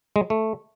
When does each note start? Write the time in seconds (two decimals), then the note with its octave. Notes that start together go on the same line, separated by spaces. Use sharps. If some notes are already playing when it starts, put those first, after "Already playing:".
0.16 G#3
0.30 A3